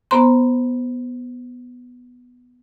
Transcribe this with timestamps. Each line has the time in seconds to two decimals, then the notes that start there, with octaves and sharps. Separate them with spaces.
0.11 B3 C5 A#5 C6